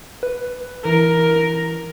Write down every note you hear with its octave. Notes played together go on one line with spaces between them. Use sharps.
B4
E3 A#4